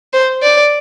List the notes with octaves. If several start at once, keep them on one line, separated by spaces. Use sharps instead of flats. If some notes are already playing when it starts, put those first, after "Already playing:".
C5
D5